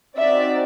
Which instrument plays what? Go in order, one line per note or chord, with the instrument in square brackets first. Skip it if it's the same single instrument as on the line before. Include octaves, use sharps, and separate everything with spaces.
[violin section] C4 D#4 F#4 D5 E5